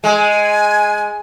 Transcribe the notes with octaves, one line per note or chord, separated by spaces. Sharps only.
G#3 G#5